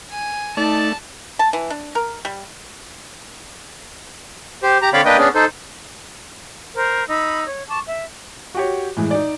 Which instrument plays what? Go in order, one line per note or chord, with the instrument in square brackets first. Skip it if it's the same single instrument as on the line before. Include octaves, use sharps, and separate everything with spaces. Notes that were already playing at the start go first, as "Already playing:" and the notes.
[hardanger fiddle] G#5
[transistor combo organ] A3 [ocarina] D#4 [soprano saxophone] D5 [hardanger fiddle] A5
[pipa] A5
E3
D4
A#4
G3
[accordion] G4 C5
G4 A#5
D3 C4 C#5 D5 F5 B5
A#3 D4 B4 D#5 G5
B3 C#4 D4 G#4
D#4 A4 C5
[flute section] A#4 C5
D#4 B5 E6
C#5
A5 C#6 D6
E5
[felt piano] F#4 G4 C#5
A2 E3 G#3
D#4 D5